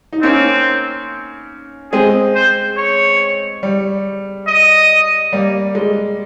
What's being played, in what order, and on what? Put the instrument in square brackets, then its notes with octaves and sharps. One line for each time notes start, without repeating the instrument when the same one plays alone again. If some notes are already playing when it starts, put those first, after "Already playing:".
[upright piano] D#4
[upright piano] A#3 C#4 [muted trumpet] C4
[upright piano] G#3 C4 [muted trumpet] G#4
[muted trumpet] C5
C#5
[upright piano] G3
[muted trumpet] D#5
[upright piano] G3 A#3
G#3